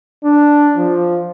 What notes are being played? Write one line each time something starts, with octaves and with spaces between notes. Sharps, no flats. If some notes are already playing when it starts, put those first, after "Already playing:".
D4
F3